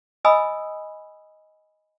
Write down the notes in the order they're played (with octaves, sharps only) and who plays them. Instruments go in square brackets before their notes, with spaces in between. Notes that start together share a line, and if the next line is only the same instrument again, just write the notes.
[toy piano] D#5 G#5 B5 D#6 E6